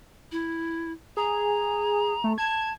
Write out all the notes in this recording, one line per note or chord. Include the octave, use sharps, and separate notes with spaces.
E4
G#4 A#5
A3
A5 G#6